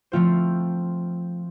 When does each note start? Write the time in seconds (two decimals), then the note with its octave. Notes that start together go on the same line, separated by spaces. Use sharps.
0.12 F3 A3 C4 F4 C5